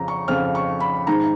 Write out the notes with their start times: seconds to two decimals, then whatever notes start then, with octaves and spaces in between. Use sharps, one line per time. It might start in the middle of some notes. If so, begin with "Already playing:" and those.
Already playing: F2 C#3 F3 A#5
0.08 C#6
0.28 F2 C#3 F3 F6
0.55 C#6
0.80 B5
1.07 G#2 D#3 A#5